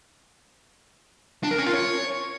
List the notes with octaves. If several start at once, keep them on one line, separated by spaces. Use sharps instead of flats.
D4
A#4
C#4
F4
C#5